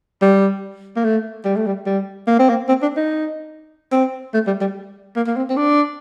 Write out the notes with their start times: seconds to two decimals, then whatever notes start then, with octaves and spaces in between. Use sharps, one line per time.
0.22 G3
0.96 A#3
1.05 A3
1.45 G3
1.56 A3
1.66 G3
1.86 G3
2.27 A#3
2.39 C4
2.49 A#3
2.69 C4
2.83 D4
2.97 D#4
3.92 C4
4.34 A3
4.47 G3
4.61 G3
5.16 A#3
5.27 A#3
5.36 C4
5.50 C4
5.57 D4